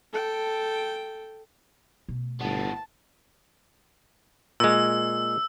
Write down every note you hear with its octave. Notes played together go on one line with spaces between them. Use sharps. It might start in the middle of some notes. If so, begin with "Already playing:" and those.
A4 G5
B2 A3
G1 A2 B3 A5
A#2 G#3 E6